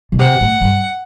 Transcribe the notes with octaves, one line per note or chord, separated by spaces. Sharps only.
B2
C3 F#5
A2
G2